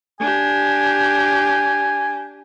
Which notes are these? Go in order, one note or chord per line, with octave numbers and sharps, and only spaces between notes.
D4 G4 G#5